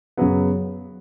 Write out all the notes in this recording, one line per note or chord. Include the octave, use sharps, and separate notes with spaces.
F#2 C#3 F#3 B3